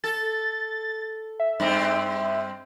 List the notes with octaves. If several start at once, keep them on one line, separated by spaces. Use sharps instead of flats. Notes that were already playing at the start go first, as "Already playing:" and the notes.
A4 A6
E5
G2 C4